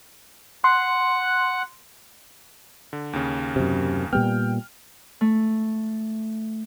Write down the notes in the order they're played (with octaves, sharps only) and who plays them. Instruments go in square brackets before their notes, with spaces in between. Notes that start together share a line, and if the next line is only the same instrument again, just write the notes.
[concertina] F#5 F#6 [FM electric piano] C6
[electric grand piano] D3
D#2 C#3
[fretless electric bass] F#2 C3
[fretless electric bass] A#2 G3 B3 [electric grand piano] G5 F6
[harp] A3